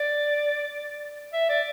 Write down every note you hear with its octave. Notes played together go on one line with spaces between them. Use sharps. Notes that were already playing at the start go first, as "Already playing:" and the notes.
Already playing: D5
E5
D5